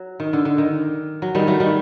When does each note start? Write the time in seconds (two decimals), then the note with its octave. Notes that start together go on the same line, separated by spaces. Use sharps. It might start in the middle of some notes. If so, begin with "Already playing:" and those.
Already playing: F#3
0.20 D#3
0.33 D3
0.45 D3
0.58 D#3
1.22 F#3
1.35 D#3 G3
1.47 F#3 A3
1.60 D#3 G3